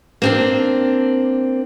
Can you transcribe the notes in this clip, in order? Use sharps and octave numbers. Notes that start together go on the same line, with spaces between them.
A#3 C4 D4